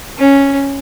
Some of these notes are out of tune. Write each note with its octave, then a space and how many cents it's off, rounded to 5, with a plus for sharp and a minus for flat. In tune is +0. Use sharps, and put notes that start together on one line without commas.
C#4 -5